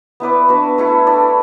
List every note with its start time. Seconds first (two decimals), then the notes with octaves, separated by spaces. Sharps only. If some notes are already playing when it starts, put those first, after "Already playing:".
0.20 B3 E4 B4 D5
0.49 B3 D4 F#4 B4
0.78 A3 E4 A4
1.07 D4 A4 D5